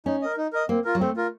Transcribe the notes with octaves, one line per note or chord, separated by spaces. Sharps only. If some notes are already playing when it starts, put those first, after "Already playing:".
C#4 D#4
A#4 D#5
D#4
A#4 D#5
A#3 C4
F4 A#4
F#3
A3 C4
F4 A#4